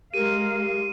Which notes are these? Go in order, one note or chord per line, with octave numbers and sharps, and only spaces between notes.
G#3 G4 A#4 F5 D#7